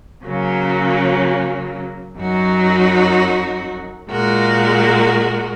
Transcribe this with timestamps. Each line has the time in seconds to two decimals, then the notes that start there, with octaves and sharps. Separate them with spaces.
0.25 C#3 F#3 A#3 C#4
2.18 F#2 F#3 D#4 F#4
4.10 A#2 G#3 F#4 A#4